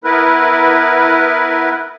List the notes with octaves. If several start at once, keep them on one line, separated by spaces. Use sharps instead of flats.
B3 E4 A#4 B4